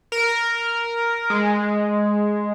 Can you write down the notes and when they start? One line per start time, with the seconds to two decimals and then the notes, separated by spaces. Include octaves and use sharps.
0.12 A#4
1.30 G#3